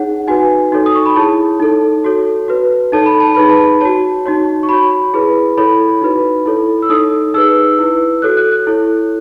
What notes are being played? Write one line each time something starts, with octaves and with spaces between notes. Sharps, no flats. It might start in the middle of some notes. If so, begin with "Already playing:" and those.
Already playing: D#4 G#4 C#5 F#5
D#4 F#4 B4 G#5
D#4 F#4 A4 C#5
D#6
C#6
B5
E4 G#4 C#5 A5
D#4 A4 C#5
F#4 A4 C#5
F#4 B4
D#4 A4 C#5 A5
B5
A5
D#4 G#4 B4 B5
A5
F#4 C#5 A5
D#4 F#4 C#5
C#6
F#4 C#5 B5
E4 G#4 B4
E4 A4 C#5 B5
D#4 F#4 B4
E4 A4 C#5
E6
D#4 A4 C#5 D#6
D#4 G#4 B4 E6
E4 B4
F#4 A4 C#5 F#6
F#6
F#6
E4 A4 C#5